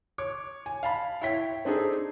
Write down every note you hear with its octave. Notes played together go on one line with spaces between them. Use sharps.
C#5 D6
G#5
F5 A5 B5
E4 C#5 G5 B6
C4 D4 D#4 G#4 A4